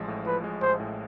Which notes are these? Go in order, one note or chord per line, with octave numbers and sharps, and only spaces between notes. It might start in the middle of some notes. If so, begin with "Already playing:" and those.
Already playing: A1 F3 G#3
A2
F3 B4
G#3
A1 C5
A2